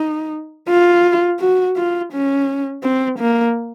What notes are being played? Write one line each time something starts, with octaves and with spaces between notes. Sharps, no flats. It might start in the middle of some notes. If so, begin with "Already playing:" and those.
Already playing: D#4
F4
F#4
F4
C#4
C4
A#3